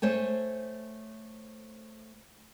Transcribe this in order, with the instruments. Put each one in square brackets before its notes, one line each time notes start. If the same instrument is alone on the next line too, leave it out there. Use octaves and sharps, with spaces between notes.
[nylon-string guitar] A3 C5 C#5 G#5